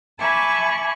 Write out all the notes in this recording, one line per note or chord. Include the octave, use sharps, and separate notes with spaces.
E5 G#5 A5 B5 C#6 D6